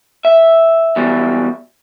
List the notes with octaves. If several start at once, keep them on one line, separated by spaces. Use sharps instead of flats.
E5
E2 B2 G3